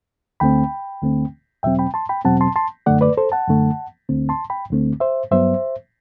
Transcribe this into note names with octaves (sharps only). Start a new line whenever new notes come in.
D2 D3 A3 C4 G5 B5
D2 D3 A3 C4
E2 B2 F#3 C4 E5 G5
G5 B5
A5 C6
G5 B5
E2 B2 F#3 C4 F#5 A5
A5 C6
A5 C6
F#2 D3 A3 D5 F#5
B4 D5
A4 C5
F#5 A5
F#2 D3 A3
D2 D3 A3 C4
A5 C6
G5 B5
D2 D3 A3 C4
C5 E5
G2 F#3 B3 C5 E5